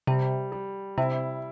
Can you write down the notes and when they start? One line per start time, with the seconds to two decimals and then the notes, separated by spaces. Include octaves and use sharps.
0.07 C3 G3
0.52 G3
0.98 C3 E4